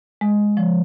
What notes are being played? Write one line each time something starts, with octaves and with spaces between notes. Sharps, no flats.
G#3
F3